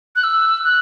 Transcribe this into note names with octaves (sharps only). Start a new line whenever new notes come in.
F#6
E6
F#6